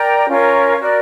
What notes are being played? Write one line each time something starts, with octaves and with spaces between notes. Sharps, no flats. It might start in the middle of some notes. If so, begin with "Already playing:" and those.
Already playing: A#4 D5 G5 A#5
C#4 F4 A#4 C#5
F#4 A#4 D5